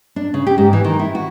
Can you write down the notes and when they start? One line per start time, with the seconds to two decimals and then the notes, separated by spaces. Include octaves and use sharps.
0.16 D4
0.34 C#3
0.47 G4
0.58 G#2
0.73 E3
0.84 D#3
0.99 E4
1.15 F#4